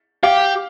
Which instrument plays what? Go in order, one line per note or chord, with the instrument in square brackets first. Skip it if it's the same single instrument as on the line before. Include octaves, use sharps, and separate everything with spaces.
[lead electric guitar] G4 [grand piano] F5